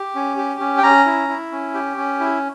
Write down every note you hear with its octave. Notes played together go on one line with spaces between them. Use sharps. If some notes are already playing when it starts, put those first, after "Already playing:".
Already playing: G4
C#4
G4
C#4
G5
C#4 A#5
E4
E4
C#4
G4
C#4
E4